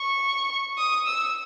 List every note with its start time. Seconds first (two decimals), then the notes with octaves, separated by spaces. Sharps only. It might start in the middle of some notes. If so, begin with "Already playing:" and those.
Already playing: C#6
0.78 D#6
1.07 E6